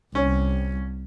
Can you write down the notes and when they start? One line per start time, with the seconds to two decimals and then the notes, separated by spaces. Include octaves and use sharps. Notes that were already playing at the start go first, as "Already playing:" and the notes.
0.15 C2 C#4